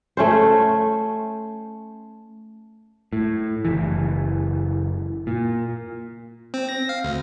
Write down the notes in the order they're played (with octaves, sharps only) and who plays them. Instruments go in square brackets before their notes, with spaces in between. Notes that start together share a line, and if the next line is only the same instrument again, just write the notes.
[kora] A3 C#4 C5
[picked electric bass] A2
F#1 E3
A#2
[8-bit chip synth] C4
A#6
F5
D2